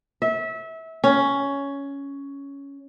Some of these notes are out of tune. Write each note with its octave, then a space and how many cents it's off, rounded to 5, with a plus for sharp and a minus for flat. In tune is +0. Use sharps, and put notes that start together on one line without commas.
E5 -25
C#4 +10